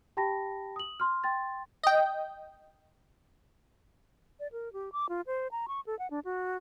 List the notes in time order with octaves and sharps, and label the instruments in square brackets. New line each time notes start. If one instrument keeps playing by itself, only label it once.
[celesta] G4 G5 A5 B5 A#6
D#6 F#7
C6 F6
G5 C6 A6
[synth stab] D#5 G5
[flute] D5
A#4
G4
D6
F4
C5
A#5
C#6
A4
F#5
D4
F#4